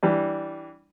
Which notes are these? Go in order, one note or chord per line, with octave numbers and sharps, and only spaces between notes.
E3 G3 D4